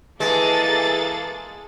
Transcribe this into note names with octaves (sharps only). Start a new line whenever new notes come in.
E3 G#3 A#3 G#4 A4 A6